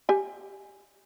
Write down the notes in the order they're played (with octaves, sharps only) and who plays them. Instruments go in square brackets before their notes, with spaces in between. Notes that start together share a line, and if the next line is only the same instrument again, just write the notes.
[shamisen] G4 G#5